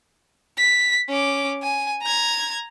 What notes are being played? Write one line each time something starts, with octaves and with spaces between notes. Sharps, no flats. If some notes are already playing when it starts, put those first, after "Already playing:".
B6
C#4 D6
G#5
A#5 G#6